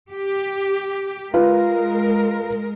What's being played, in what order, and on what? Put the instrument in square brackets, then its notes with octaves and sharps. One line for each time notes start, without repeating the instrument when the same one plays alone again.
[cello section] G4
[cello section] G#3 A#4 [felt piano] F4 B4